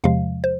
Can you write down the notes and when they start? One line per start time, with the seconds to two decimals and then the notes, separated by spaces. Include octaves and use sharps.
0.04 E2 C3 F3 G#3 F5
0.44 C5